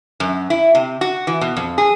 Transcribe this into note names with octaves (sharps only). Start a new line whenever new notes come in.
F#2
E4
C3
F#4
E3
B2
F2
G#4